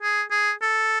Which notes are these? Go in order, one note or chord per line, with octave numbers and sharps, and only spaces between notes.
G#4
G#4
A4